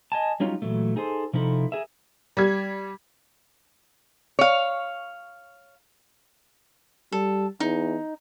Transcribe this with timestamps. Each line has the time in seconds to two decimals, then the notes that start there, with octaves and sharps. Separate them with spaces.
0.12 D#5 G#5 A5
0.40 F#3 G3 C#4 D#4 F4 C#5
0.62 A#2 E3 F#3 A3
0.96 D#4 G#4 A4 C5
1.33 C3 F3 D#4 E4 A4
1.72 G#4 A#4 E5
2.37 G3 G#6
4.39 C#5 F5
7.12 G3 A4
7.60 E2 D#4